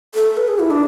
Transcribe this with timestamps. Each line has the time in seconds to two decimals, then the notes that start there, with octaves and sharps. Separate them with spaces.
0.15 A4
0.37 B4
0.48 G#4
0.59 E4
0.70 D4